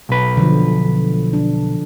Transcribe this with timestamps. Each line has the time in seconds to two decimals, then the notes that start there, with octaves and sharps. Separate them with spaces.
0.09 B1 B4
0.37 D3 F3
1.33 D4